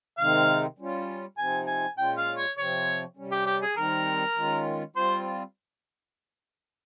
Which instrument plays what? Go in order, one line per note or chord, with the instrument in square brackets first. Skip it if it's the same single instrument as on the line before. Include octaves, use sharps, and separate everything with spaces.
[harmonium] C3 D#3 G#3 C4 D#4 [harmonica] F5
[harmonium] G3 C#4 F4
[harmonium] C3 F3 C4 D#4 [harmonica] G#5
[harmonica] G#5
[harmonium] A#2 G#3 C#4 F4 [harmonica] G5
[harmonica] F5
C#5
[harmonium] C3 F3 C4 [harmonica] C#5
[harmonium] C3 G3 C#4
[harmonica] G4
G4
G#4
[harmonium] D#3 G3 C4 D#4 [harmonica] A#4
[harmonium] D#3 G#3 C#4 F4
[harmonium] G3 C4 F4 [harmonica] C5